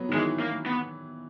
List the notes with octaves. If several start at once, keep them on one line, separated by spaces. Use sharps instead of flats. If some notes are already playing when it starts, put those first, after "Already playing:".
Already playing: F#3 B3
D#3
E3 G#3
A#3
B3